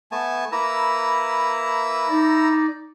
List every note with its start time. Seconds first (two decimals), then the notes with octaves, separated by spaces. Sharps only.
0.12 A3 B3 G#5 A5
0.52 A#3 E4 B4 A#5 E6
2.09 D#4 D5